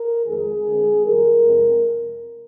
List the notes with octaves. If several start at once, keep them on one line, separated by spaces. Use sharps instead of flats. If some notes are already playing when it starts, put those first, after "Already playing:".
Already playing: A#4
F2 D#3 G#3 G#4
D3 G#3 C4
F2 D#3 G3 A#4
F2 C3 F3 G#3 C4